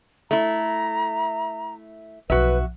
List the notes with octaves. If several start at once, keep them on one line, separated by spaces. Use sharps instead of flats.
A3 E4 A#5
B1 F3 F#4 B4 E5